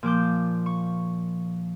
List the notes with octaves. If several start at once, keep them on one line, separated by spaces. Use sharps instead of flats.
A#2 F3 D6 G6
C#6